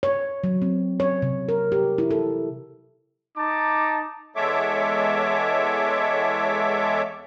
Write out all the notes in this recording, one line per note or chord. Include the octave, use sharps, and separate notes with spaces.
C#5
F#3
C4
C#5
C3
A#4
G4
E4
A4
D#4 A5 D6
E2 G#3 A4 C#5 E5 D6